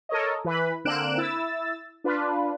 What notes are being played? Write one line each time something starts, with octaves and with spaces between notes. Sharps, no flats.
A4 A#4 C#5 D#5
E3 B4 B5
D3 A#3 C4 F#6 D7 E7
E4 E6 A6
D4 F4 B4